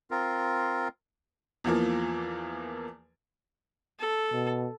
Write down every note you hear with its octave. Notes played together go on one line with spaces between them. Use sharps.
C4 F4 A#4
E2 E3 F3 A#3
A4
B2